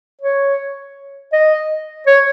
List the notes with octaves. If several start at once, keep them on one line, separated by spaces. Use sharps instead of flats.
C#5
D#5
C#5